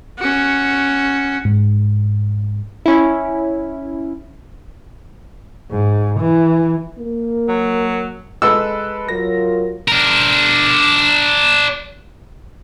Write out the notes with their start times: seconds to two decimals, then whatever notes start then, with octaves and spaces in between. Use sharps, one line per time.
0.19 C#4 F#4
1.45 G#2
2.86 C#4 E4
5.71 G#2
6.20 E3
6.98 A#3
7.49 F#3
8.42 G#3 A4 B4 E6
9.08 F#3 F4 A#4 A#6
9.88 D4 A#4